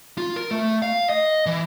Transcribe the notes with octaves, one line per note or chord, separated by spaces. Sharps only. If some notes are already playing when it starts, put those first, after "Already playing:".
F4
A#4
A3
F5
D#5
E3